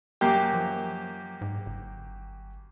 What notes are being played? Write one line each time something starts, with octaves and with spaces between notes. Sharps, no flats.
F#2 A#3 G4
F3
G#2
G1